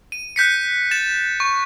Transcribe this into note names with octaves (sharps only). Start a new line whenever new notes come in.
D#7
F#6 G6 B6 C#7
A6 E7
C#6